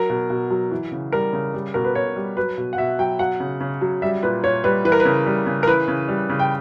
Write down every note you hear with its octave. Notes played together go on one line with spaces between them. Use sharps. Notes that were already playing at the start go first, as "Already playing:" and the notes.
Already playing: F#3 A#4
B2
B2
F#3
E3
C#3
G3 A#4
C#3
G3
B2 A#4
B4
B2 C#5
G3
F#3 B4
B2
F#5
B2 E5
F#3 G5
F#3 F#5
C#3
C#3
F#3
G3 E5
A#2 B4
A#2 C#5
G3 B4
E3 B4
A#4
B4
C#3
G3
C#3
A#4
E3 B4
C#3
G3
C#3
G5